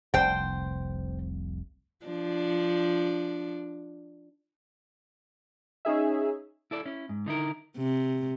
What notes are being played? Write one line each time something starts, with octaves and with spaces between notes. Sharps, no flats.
F1 C2 C5 G5
F3 D4
C#4 D#4 G#4 E5
E4 A4 D5
C#4 E4
G#2
D3 D#4 E4 A#4
C3